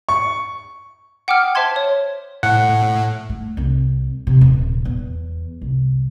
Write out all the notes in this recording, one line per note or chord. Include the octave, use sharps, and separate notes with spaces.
C#6
F#5 G5 D6 D#6 F6
C5 E5 A5 C6 G#6
C#5
A2 F#5
A3
C2
C3
D#1
E2
C2